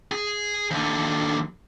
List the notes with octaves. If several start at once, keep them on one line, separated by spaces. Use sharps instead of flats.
G#4
D#2 D3